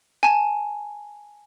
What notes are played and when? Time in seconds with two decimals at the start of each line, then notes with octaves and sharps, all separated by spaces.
0.23 G#5 A5